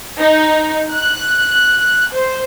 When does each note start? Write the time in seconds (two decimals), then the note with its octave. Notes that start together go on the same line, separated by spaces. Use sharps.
0.20 D#4
0.93 F#6
2.14 C5